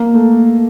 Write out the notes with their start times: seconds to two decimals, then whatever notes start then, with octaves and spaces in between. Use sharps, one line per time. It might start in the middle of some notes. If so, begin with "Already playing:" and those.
Already playing: A#3
0.14 A3